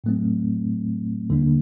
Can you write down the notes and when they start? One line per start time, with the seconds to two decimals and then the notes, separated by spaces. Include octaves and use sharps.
0.04 A2 F#3 A3 C4
1.30 D#2 D3 G3 A#3 D4